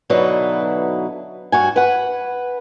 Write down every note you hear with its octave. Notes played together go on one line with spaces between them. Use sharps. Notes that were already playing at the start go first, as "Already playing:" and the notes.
B2 D3 F#3 D#4 E4 B4
G2 F#4 G#5
B4 F#5